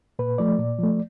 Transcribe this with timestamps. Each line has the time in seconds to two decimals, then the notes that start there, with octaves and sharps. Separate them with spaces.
0.19 A#2 B4
0.38 F3 A3 D5
0.58 A#2
0.79 F3 A3